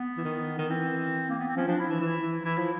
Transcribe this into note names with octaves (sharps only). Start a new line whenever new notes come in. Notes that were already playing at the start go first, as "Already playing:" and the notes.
Already playing: B3
E3
D#3
D#3
E3 C4
A#3
B3
C4
F3 C#4
F3 D4
E4
E3
E3 E4
E3
E3 E4
F3